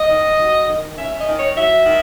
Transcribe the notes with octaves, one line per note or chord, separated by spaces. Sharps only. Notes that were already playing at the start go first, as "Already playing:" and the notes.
Already playing: D#5
D#3
F#3
D#3
C#4 E5
D#5
D#3
C#5
F#3 E5
D#3